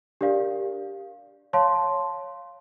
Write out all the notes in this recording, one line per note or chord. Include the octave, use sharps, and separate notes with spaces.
D4 G4 A#4 D5 F5
C#5 F5 A5 C6